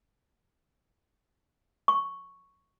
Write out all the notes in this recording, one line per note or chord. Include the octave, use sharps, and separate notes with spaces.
C#6